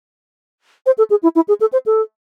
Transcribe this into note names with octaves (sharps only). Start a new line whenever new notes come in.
C5
A4
G#4
E4
E4
G#4
A4
C5
A4